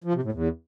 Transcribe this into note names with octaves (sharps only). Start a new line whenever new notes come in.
F3
C3
A2
E2